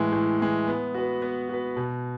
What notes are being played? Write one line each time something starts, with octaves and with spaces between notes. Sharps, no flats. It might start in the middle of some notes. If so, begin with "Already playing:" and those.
Already playing: A2 E3 G#3
A2
E3 G#3
B3
F#4 B4
B3
F#4 B4
B2